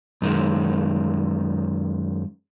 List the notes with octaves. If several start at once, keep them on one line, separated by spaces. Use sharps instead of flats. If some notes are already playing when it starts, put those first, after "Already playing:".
F#2 D#3 G#3